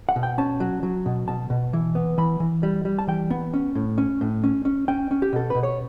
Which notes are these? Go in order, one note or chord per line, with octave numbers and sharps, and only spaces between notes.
F#5
B2
G5
C#4 A5
F#3
F#3
B2
B2 A5
B2
E3
B3
E3 B5
E3
G3
G3
A5
E3 G5
B3
C#4
A2
C#4
A2
C#4
C#4
C#4 G5
C#4
G4
B2 A4
B2 B4
C#5